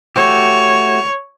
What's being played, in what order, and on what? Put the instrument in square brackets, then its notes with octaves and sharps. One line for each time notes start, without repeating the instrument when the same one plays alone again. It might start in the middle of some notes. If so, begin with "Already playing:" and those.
[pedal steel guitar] A3 F#4 G4 [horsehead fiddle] C#5